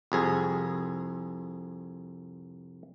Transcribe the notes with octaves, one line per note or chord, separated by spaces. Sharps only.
C2 F2 G#4